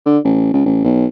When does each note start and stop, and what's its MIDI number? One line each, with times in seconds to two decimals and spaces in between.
0.06 0.18 50
0.24 0.52 33
0.53 0.62 37
0.66 0.83 33
0.84 1.06 35